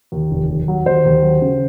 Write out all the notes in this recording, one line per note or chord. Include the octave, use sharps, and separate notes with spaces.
D#2
F1
D#2
F#3
D#2 C5
D#2
F#3
C#3